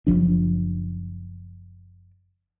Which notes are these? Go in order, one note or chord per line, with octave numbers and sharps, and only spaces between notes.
F#1 E2 F3 D4